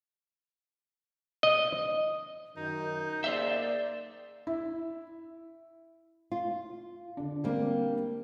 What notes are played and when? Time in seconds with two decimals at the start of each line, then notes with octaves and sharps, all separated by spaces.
1.43 D#5
2.57 F#2 D#3 D#4 G6
3.24 A#3 G#4 C5 D5 E5
4.47 E4
6.32 F4
7.17 D3 D4
7.44 G3 A#3 C4 D4 A#4